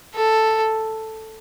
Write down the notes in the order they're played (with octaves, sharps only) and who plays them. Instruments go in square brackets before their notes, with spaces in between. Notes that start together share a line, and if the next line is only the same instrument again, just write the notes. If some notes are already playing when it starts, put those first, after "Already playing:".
[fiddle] A4